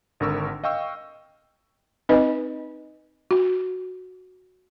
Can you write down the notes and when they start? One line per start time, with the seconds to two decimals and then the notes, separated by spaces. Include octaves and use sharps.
0.20 G#1 D3 A#4 C#6 E6
0.64 D#5 F5 G5 C#6 E6
2.09 C4 D#4 B4 D#5
3.31 F#4